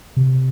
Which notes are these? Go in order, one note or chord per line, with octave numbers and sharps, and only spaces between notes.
C3